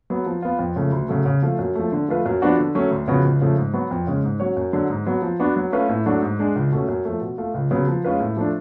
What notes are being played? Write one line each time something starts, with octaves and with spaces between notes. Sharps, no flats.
F#3 B3
F3
B3 F4
F2
C#3 F3 A3
D2
C#3 F#3 A3
C#3
F3 A3 F4
F#2
F3 A3
D3
F3 A3 F4 B4
F#2
F3 B3 D4 F#4
D3
F#3 A3 C#4
D2
C#3 F3 B3 F#4
C#2
C#3 F3 A3
G#2
F#3 B3 F#4
F2
C#3 G#3 C#4
G#2
F#3 C#4 F#4 C#5
F#2
D3 F#3
G#2
F#3 B3 F#4
F3
B3 D4 F#4
F#3
A3 C#4 F4 B4
A2
F#3 A3 D4 F#4
G#2
G#3 D4 G#4
C#2
B2 A3 C#4
F#2
F3 A3
B2
A3 F4
C#2
C#3 F#3 B3
F3
G#3 C#4 F4 B4
A2
F3 A3 D4